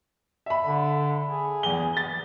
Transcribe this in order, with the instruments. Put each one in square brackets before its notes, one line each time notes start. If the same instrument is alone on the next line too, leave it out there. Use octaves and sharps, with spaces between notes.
[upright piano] E5 B5
[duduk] D3
G#4
[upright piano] E2 G7
A6